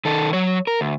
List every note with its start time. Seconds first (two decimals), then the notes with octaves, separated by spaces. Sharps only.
0.05 D#3 A4
0.33 F#3 C#5
0.67 A#4
0.81 D2